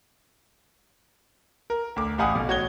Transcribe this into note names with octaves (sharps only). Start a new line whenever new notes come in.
A#4
D2 D6
A1 G4 F5 F#5 G#5 D#6
B1
A1 F#4 C#5 G#6 G7